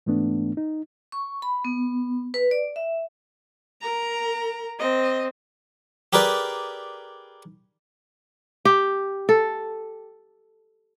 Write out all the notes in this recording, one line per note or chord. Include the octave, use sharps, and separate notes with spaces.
G#2 E3 A3 B3 D4
D#4
C#6
B5
B3
B4
D5
E5
A#4 A#5
C4 D#5
G4 G#4 A#4 B4 D5
G4
A4